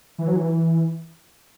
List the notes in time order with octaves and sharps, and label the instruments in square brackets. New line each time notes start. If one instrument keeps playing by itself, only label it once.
[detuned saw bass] E3
F#3
E3